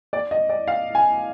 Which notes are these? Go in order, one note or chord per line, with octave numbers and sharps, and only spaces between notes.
D5
D#5
D5
F5
G#5